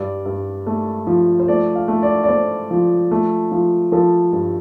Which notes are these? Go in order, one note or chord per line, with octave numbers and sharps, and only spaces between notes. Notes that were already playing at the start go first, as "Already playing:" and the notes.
Already playing: G2 D5
G2
A3
F3
C5
A3 D5
F5
A3
D5
D5
A3 C5
F3
A3
F3
F3 A4
G2